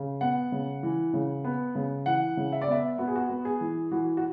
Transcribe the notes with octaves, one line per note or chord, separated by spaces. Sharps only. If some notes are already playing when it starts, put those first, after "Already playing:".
Already playing: C#3
B3 F#5
C#3
E3
C#3
B3
C#3
E3 F#5
C#3
E5
D5
B3 E5
B3 F#4
G#4
F#4
B3
G#4
E3
E3 F#4
F#4